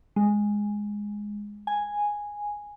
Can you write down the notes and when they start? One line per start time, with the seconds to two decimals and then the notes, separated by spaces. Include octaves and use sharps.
0.16 G#3
1.67 G#5